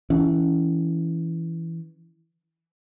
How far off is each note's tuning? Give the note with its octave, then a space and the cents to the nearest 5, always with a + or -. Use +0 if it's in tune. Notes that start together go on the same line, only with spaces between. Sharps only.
E3 +0 C#4 +20